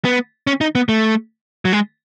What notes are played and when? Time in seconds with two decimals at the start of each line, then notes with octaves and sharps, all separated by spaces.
0.05 B3
0.47 C#4
0.61 D#4
0.75 B3
0.89 A3
1.65 F#3
1.73 G#3